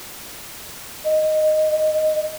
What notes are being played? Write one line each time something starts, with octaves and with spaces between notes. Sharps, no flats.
D#5